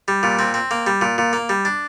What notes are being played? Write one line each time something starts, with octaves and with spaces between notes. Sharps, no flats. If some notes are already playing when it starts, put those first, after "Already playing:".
G3
A#2
C4
C4
A#3
G3
A#2
A#2
A#3
G3
D4